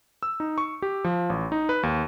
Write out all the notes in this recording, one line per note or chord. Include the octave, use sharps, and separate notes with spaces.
E6
D#4
C#6
G4
F3
A1
D#4
B4
D#2